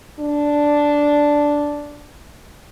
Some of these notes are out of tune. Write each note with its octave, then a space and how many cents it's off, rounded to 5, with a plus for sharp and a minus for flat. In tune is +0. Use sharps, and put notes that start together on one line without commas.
D4 -5